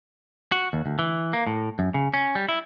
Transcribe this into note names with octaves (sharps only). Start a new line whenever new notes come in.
F#4
D#2
D2
E3
A#3
A2
F#2
C#3
C#4
G3
E4